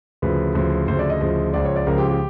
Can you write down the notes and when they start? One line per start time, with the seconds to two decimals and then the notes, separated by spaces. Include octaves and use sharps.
0.22 D2 C#3 F3 B4
0.55 D2 C#3 F3
0.88 D2 C#3 F3 C5
0.99 D5
1.10 D#5
1.21 D2 C#3 F3
1.54 C#2 C#3 F3 D5
1.65 C#5
1.76 D5
1.87 C#2 C#3 F3 A#4
1.98 G4
2.09 G4